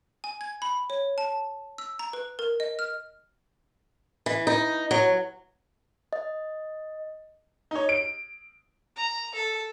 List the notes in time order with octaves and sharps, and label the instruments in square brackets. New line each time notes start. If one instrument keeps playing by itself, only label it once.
[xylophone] G#5
G#6
B5
C#5
A5
E6
A#5
B4
A#4
D#5
F6
[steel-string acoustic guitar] E3
D#4
F#3
[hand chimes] D#5
[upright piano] D#4 C#5
D7
[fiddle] A#5
A4